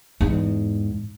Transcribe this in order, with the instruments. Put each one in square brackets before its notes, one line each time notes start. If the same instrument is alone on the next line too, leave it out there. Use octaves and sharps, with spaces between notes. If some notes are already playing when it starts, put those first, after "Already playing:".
[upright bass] E2 G#2